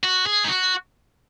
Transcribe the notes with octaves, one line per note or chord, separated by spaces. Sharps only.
F#4
G#4
D#4
F#4